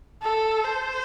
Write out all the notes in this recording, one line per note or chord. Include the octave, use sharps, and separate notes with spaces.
A4
C5